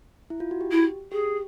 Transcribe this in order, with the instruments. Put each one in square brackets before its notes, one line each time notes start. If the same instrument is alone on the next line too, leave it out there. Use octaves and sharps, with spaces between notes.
[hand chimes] E4
F4
F#4
G4
[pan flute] E4
[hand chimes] G4 [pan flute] G#4